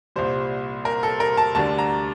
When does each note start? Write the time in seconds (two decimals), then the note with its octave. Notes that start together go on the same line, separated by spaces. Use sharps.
0.16 C2 A#2 G3 C5
0.85 A#4
1.03 A4
1.20 A#4
1.37 A5
1.55 D2 D3 G3 A5
1.78 A#5